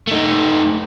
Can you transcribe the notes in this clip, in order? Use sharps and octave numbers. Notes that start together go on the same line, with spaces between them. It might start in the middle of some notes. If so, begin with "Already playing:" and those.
A3 D#4